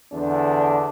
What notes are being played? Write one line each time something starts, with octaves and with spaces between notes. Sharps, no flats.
E2 D3 D4